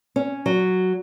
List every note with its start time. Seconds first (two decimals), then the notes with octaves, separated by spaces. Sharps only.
0.16 C#4
0.46 F#3